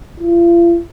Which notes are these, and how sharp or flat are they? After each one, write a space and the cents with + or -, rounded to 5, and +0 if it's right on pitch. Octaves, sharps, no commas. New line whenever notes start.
F4 -40